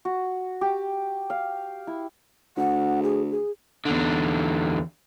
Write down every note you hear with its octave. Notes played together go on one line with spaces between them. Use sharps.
F#4
G4
F5
E4
D2 F#5
G#4
G#4
E2 D3